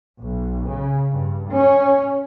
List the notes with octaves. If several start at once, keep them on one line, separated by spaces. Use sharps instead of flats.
B1
C#3
G2
C#4